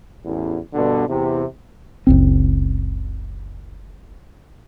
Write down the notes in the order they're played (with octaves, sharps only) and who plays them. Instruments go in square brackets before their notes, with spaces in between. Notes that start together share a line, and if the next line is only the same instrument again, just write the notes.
[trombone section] A1 E2
G2 B2 D3
E2 C3
[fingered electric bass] F#1 C#2 C4